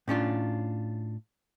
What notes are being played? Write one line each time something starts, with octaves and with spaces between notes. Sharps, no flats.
A2 C#4 D4 F4